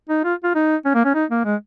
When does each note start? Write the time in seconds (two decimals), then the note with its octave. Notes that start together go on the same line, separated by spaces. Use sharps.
0.09 D#4
0.24 F4
0.44 F4
0.55 D#4
0.85 C#4
0.94 A#3
1.05 C#4
1.14 D#4
1.30 A#3
1.45 G#3